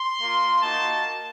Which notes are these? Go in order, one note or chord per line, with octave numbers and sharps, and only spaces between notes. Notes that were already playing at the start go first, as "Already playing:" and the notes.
Already playing: C6
A#3 F4
A#3 D#4 F#4 A5